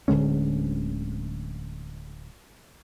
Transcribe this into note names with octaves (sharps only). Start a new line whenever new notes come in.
D1 D3 G#3 C#4